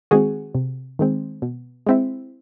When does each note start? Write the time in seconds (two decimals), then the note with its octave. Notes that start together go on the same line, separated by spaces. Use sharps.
0.11 D#3 G#3 C4 F#4 G#4
0.55 C3
0.99 D#3 G#3 C4
1.42 B2
1.87 G#3 C4 E4